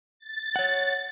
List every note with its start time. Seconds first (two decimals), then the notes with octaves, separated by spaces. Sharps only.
0.20 A6
0.56 C#5 F#5